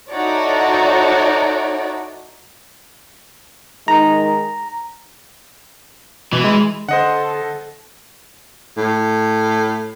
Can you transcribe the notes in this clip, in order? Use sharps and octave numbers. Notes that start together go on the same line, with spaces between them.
D#4 E4 F#4 A4 C#5 D5
D#3 G#3 D#4 A#5
B2 E3
G#3
D3 A4 C5 D#5 F#5
A2